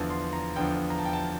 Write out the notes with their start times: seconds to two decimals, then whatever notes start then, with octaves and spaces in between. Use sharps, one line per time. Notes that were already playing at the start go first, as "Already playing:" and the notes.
Already playing: E2 D3 F3 A5
0.10 C6
0.33 A#5
0.56 E2 D3 F3 G5
0.90 A#5
0.99 A5
1.05 G5
1.13 A5